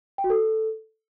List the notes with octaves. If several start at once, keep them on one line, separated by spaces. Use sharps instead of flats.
G5
F#4
A4